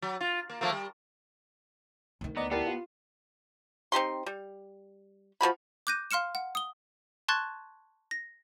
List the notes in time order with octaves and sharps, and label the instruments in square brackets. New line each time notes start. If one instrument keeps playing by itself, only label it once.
[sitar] F#3
F4
A#3
F3 A3 A#3
G3
[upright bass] D2 D#3
[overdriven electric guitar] B3 [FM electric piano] D5 D#5 A#5
[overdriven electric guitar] B3 [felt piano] E4 A#4 D5 [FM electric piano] G4 A5 C7
[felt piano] F4
[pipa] C4 D#4 G4 C6
G3
F3 A#3 F#4 B5
[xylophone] D6 F#6 G6 A#6 D#7
F5 C6 F6 C#7 E7
F#5
D#6 G7
A5 C6 C#6 F#6 G#6 A6
A#6